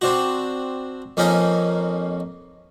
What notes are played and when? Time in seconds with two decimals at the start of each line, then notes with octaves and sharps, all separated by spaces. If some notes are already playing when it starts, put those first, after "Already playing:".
0.01 C4 D4 F#4
1.17 F2 A#3 C#4 D#4 G#5